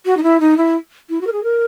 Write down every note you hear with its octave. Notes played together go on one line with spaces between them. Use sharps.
F#4
D#4
E4
D#4
E4
E4
F#4
A#4
G#4
A#4